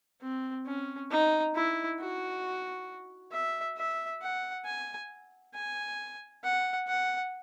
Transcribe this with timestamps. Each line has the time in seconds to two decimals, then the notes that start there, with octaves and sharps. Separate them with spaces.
0.22 C4
0.66 C#4
1.11 D#4
1.55 E4
2.00 F#4
3.32 E5
3.77 E5
4.22 F#5
4.65 G#5
5.54 G#5
6.44 F#5
6.87 F#5